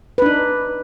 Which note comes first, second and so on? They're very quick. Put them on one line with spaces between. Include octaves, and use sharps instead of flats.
B4 D4 D#4